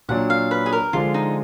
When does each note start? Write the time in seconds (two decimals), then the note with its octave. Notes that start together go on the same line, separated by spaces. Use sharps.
0.09 A#2 F#3 D4 F#5
0.30 F5
0.51 B4
0.66 G#4
0.73 A#4
0.93 D3 F3 G#3 D4 F4
1.14 D#4